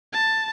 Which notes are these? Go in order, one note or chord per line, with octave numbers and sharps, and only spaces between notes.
A5